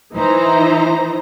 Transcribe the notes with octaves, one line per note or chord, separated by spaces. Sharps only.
E3 D#4 E4 C5 A#5